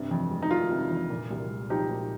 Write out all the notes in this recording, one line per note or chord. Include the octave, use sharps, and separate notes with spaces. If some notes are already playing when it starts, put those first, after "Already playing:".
Already playing: G2 C3
F2
G#3
D#4
D#3 F4
C3
F2
A#2
C2
G#3
F3 D#4 G4
A#2